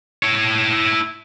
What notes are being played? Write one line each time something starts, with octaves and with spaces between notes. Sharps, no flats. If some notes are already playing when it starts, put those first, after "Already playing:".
E4 C#5